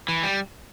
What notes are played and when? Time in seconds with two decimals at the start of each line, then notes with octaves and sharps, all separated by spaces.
0.08 E3
0.23 G3